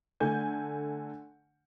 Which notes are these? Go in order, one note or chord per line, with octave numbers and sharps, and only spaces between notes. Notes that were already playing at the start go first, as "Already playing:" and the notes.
D3 A3 G#5 G6